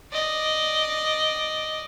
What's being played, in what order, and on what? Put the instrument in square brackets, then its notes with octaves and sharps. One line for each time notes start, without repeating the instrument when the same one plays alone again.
[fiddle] D5 D#5